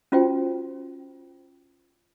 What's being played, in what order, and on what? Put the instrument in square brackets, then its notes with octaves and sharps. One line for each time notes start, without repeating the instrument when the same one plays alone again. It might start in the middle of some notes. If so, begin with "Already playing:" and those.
[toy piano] C#4 F4 F#4 C5 G5